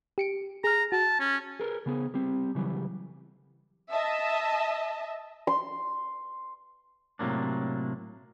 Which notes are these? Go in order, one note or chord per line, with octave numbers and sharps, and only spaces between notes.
G4 C#7 D7
G#4 A#5 F6
F#4 A5
C#4
G#4 A#4 B4
C#3 B3 G#4
G3 C4
C#3 E3 F#3 G3
D#5 E5 A5
C6
A2 C3 F#3 A#3 D4